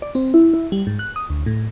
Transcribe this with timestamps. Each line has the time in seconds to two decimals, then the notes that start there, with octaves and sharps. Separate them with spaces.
0.02 D5
0.15 C4
0.34 E4
0.54 E4
0.72 G3
0.87 G#2
0.99 F#6
1.16 D#6
1.30 D2
1.46 A2